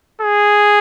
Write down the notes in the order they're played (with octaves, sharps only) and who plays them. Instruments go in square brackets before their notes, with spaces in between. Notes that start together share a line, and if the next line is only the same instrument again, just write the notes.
[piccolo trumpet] G#4